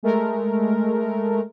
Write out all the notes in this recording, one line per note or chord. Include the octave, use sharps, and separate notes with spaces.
G#3 A3 A#4